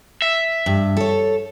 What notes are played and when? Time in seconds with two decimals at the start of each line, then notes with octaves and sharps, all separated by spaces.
0.22 E5
0.66 G2
0.97 A4 C#5